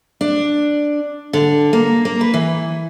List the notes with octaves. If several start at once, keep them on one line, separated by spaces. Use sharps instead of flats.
D4
D3
A#3
A#3
B4
E3